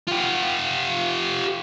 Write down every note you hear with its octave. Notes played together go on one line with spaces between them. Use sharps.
F4 G4